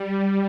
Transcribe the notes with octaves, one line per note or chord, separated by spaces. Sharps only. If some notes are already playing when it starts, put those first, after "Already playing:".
Already playing: G3